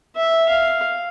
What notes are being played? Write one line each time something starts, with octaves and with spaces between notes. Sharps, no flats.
E5
F5